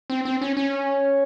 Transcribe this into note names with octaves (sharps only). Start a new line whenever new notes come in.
C4
C4
C#4
C#4